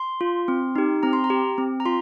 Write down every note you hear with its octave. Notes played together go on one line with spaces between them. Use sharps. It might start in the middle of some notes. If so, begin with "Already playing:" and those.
Already playing: C6
F4
C4
D#4 G4
C4 A#5
C6
A#5
G4
C4
A#5
F4 C6